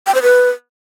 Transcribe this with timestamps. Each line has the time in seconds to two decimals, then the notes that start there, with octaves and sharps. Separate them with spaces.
0.07 G5
0.15 C5
0.22 B4